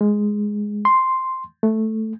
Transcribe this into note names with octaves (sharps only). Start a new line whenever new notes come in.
G#3
C6
A3